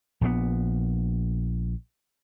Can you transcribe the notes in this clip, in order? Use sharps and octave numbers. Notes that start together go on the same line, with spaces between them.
A#1 A#2 E3 B3